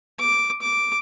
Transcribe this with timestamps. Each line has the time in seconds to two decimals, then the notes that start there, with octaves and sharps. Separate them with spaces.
0.20 D6
0.62 D6